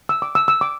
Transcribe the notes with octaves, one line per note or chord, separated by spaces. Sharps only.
E6
D6
E6
E6
D6